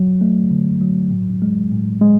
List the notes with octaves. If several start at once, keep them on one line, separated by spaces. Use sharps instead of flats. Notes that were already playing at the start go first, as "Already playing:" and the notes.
Already playing: F#3
A3
D3
F#3
A2
G#3
A2
G#3